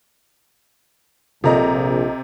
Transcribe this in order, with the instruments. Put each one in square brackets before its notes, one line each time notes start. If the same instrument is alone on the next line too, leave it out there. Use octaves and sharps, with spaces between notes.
[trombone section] A#1 [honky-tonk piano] C3 A#5 [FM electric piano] F4 A4 D#5